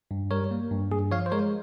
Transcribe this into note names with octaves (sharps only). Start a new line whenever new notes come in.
G2
G3 A#4 C#5
A#3
G2
G2 G#4
F3 C#5 F5
C5
G#3 A#4 C#5